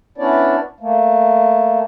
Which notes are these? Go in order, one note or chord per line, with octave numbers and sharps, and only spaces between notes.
B3 C#4 D4 E4 C#5 D5
A3 A#3